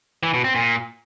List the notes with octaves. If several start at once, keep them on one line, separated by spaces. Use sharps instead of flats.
E3
B2
C4
A#2